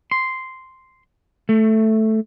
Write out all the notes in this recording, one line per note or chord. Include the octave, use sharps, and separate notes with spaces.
C6
A3